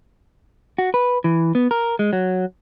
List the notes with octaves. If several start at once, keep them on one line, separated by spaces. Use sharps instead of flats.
F#4
B4
E3
B3
A#4
G#3
F#3